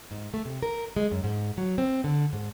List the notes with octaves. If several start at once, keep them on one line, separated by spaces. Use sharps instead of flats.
G#2
A3
C3
A#4
G#3
F#2
G#2
F#3
C4
D3
G#2